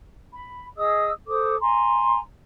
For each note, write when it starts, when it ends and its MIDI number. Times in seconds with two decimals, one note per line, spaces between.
0.32 0.66 83
0.77 1.10 68
0.77 1.10 75
0.77 1.10 87
0.77 1.10 88
1.27 1.54 69
1.27 1.54 72
1.27 1.54 86
1.27 1.54 87
1.60 2.19 80
1.60 2.19 82
1.60 2.19 84